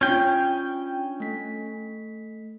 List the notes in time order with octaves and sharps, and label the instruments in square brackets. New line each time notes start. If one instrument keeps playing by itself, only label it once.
[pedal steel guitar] C#4 G5 [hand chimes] D4 F4
[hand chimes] A3 B6